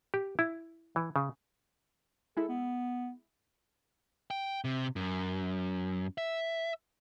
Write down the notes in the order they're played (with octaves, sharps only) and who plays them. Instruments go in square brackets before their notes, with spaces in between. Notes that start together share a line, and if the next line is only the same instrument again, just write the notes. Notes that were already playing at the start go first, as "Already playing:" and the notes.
[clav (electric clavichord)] G4
E4
E3
C#3
[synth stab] G#3 E4 [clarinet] A4
[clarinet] B3
[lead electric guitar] G5
C3
F#2
E5